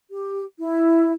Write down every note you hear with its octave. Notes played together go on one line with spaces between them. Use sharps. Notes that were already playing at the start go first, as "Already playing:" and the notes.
G4
E4